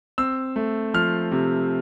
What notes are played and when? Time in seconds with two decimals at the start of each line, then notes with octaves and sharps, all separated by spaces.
0.18 C4 E6
0.56 A3
0.94 F3 F6
1.32 C3